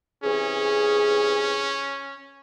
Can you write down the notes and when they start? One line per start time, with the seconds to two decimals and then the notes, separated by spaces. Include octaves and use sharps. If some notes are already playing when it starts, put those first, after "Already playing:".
0.24 C3 E3 C#4 G#4